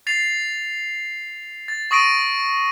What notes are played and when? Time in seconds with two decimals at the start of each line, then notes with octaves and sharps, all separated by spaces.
0.07 A6 C7 F7
1.68 A6
1.91 C#6 D#6 A#6 D7 D#7